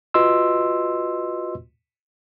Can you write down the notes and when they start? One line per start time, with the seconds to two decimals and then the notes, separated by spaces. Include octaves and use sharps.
0.14 F4 F#4 B4 D#5 C6 E6